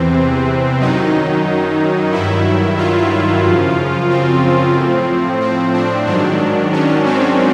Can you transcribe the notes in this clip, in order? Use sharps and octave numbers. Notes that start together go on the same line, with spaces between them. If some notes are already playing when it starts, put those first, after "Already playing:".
Already playing: E2 C3 E3 C4
F#2 D#3 F#3 D#4
G2 D#3 F#3 E4
F4
F#2 C#3 F3
C4
A2 F3
C4
D4
G#2 D#3 F#3 D4
C#4
C4